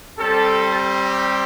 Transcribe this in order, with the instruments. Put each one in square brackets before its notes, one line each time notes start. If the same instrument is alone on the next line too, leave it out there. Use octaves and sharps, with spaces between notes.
[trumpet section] G3 C4 G4 A4